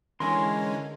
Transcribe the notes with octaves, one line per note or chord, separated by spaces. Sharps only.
D3 E3 G#3 C#4 A#4 G#5 C6